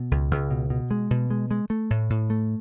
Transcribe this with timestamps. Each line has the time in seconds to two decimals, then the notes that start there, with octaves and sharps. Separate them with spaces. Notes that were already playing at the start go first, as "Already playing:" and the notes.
Already playing: B2
0.11 C#2
0.31 C#2
0.51 B2
0.70 B2
0.91 G#3
1.11 B2
1.31 G#3
1.51 G#3
1.70 A3
1.90 A2
2.10 A2
2.30 A3